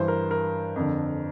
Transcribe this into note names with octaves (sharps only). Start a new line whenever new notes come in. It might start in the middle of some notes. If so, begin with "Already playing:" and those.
Already playing: G2 E3 C5
A#4
A#4
F2 D3